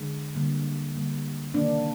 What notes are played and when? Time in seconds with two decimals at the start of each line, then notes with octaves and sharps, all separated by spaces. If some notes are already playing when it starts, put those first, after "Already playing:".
Already playing: D3 G#3
0.35 D3 G3 A#3
0.95 D3 G3 A#3
1.54 C3 D#3 A#3 D4